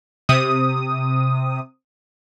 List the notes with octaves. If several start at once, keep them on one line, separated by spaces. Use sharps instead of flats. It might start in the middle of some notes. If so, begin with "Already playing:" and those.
C3 D#6